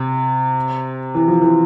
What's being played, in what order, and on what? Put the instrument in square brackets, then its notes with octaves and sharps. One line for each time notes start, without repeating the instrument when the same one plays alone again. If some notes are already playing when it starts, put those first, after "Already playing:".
Already playing: [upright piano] C3
E3
F3
E3